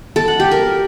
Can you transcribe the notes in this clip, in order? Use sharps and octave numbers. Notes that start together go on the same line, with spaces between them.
A4
F#5
G4
A#4